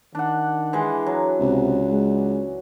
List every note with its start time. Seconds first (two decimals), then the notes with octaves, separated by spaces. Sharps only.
0.15 D#3 D4 F#5
0.73 E3 G#3
1.06 F#3
1.40 C#2 C3
1.92 G#3